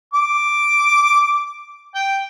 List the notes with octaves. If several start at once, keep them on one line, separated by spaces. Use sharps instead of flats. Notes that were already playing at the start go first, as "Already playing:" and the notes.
D6
G5